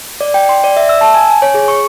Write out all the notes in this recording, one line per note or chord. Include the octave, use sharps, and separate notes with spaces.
D5
G5
C6
D5
E5
E6
A5
G#5
G#5
C#5
G#4
C#6